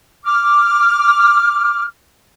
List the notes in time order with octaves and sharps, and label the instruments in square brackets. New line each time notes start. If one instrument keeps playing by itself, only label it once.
[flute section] D6 F6